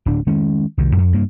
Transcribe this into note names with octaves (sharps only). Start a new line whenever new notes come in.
D1 D4
D#3 G#3 C#4
C2 D#3
F2
G2 A#3